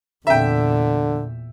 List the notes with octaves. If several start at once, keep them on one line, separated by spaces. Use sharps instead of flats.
E2 A#2 D3 E5 G5